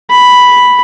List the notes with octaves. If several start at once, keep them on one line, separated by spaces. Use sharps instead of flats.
B5